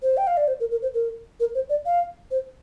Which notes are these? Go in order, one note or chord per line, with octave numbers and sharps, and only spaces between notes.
C5
G5
F5
D5
C5
A#4
A#4
C5
A#4
A#4
C5
D5
F5
C5